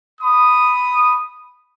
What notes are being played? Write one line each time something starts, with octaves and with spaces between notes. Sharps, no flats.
B5 D#6